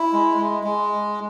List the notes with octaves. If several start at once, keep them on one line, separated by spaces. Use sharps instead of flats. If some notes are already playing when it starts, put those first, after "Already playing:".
Already playing: E4
G#3
G#3
G#3